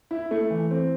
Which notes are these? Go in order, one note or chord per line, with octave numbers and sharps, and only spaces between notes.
E4
A3
E3
C4